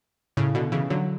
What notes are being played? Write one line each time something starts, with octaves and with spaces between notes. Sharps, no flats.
A2 C#3
B2 D3
C#3 E3
D3 F#3